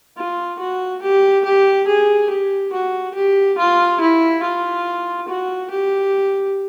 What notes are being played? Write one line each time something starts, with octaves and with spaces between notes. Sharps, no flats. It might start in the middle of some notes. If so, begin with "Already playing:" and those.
F4
F#4
G4
G4
G#4
G4
F#4
G4
F4
E4
F4
F#4
G4